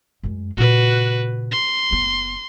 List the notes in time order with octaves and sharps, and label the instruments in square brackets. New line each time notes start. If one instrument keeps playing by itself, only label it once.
[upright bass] F#2 G#3
[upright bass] A#2 C#3 [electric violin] F#4 B4
[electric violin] C6
[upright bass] F#1 B3